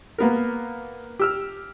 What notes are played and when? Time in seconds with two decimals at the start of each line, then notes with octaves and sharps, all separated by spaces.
0.18 A#3 B3 A#4
1.19 G4 E6 F6